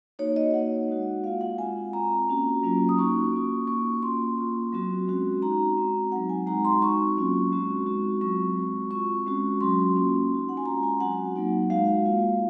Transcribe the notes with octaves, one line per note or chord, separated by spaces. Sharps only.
A#3 D#4 F#4 C#5
D#5
A#3 D#4 F#4 F#5
G#3 D#4 F#4
A#3 F4 F5
F#5
G#3 C4 F4 G#5
C4 F4 A#5
A#3 C#4 F#4
F#3 A#3 C#4 F4
D#6
A#3 D#4 F#4 C#6
A#3 C#4 F4
A#3 D#4 F#4 C#6
A#3 C#4 F4 C6
A#3 F4
F#3 C4 F#4
G#3 C#4 F#4
C4 D#4 F#4 A#5
G#3 C4 F#4
F#3 C4 D#4 F#5
G#5
G#3 D#4 F#4 A#5
C6
C4 D#4 F#4 C#6
F#3 A#3 C#4 F4
G#3 C4 F#4
G#3 C4 D#4 F#4
F#3 C4 F4 C#6
G#3 C4 F#4
C4 F4 C#6
G#3 C#4 F#4
F#3 C#4 F#4 C6
A#3 C#4 F4
C4 D#4 F#4
F#5
G#5
G#3 C#4 F4 A#5
G#5
F#3 C4 F#4 F#5
F#3 A#3 D#4
G#3 D#4 F#4 F5
A#3 F4